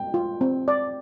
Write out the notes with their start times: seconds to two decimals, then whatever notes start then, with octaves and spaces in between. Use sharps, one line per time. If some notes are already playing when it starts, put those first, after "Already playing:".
Already playing: G5
0.14 F4
0.41 C4
0.68 D5